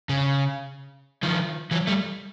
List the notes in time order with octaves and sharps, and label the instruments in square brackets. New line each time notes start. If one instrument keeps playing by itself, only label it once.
[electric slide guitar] C#3
D#3 F3
E3 F#3
G3 A3